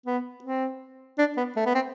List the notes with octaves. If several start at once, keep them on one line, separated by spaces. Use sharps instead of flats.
B3
C4
D4
B3
A3
B3
C4